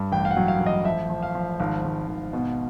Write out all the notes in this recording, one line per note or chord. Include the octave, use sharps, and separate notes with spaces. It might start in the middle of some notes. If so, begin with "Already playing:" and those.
Already playing: G2
A1 G5
F5
F#5
F#3
F5
A1
D#5
F3 E5
F3
F5
F3
G#1 F5
G#1
G#1
B2